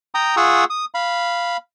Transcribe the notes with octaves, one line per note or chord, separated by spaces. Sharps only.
G5 A#5 D#6
F4 G#4 F#5 C#6 D#6 E6
D#6
F5 B5